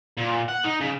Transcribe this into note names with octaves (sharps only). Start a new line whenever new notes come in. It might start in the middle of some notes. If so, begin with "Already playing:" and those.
A#2
F#5
D#4
C#3